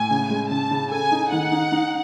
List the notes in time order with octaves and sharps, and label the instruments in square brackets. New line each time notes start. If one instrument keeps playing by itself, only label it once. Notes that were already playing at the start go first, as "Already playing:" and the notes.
Already playing: [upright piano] A2 [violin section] G#5
[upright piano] C#3
G#3
[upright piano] C#3 [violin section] A5
[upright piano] C#3
[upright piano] A4 [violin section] G#5
[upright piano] D#4
[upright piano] D#3 [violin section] F#5
[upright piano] D#4
D#4